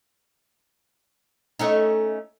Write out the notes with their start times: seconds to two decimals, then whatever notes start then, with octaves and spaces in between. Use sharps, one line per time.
1.59 A3 C#4 D#4